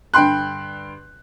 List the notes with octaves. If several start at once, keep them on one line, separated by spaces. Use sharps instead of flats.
G2 D3 G5 B5 C6 F#6